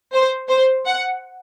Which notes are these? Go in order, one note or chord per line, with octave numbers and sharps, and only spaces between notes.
C5
C5
F#5